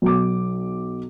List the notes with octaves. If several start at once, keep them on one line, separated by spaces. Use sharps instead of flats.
B1 D6